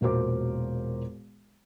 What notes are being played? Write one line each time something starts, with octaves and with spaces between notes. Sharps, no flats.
E1 A#2 F#4 A#4 C5 D6